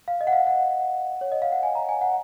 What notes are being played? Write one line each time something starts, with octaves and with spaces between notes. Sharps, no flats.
F5
D#5
F#5
F5
F#5
C#5
D#5
F5
F#5
G#5
A#5
G#5
F#5